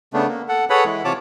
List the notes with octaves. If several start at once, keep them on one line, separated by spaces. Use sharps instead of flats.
C#3 A3 B3 D4
A#3
A4 F#5
G#4 A4 B4 C#5 F#5 B5
E3 G#3 E4
C3 E3 F4 C#5 A5 D6